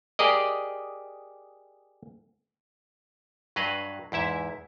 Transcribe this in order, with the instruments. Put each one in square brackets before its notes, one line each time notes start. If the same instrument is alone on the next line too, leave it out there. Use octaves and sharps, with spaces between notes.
[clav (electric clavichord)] G4 G#4 A#4 D5 D#5
G2 F#3 B4 D#5 F5
E2 G#2 E4 E5